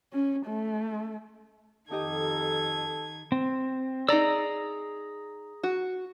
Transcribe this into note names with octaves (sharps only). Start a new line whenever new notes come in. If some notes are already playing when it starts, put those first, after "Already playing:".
C#4
A3
F2 D#3 D#4 G4 A4 D#5 G#6
C4
D#4 G#4 D5 A#5 E6
F#4